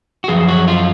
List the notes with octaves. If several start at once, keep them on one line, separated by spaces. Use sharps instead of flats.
F#4
F#2 F3 G#4
F#4
F4